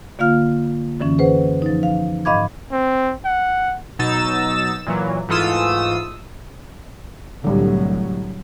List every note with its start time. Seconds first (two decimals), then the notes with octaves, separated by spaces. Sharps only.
0.19 D3 A#3 F4 F5 F6
1.00 F#2 D3 E3 C#4
1.18 G#4 B4 C5 F#5
1.62 F3 D#4
1.83 F5
2.25 G#2 D#5 F5 B5 D6 G#6
2.72 C4
3.25 F#5
3.99 B2 F#3 D#4 E6 A6 E7
4.87 A#2 E3 F#3
5.29 G#2 E3 A3 F4 D#6 E6
7.44 C2 A2 D3 F#3 G3